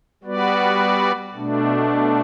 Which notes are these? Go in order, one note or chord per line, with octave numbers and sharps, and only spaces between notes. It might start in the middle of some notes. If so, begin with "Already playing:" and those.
G3 B3 F#4 B4 D5
B2 A3 D4